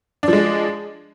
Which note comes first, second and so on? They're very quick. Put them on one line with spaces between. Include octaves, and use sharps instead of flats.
D4 F3 G#3